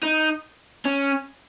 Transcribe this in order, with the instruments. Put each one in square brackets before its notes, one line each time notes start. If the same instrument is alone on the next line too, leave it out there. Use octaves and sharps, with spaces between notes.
[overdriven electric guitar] D#4
C#4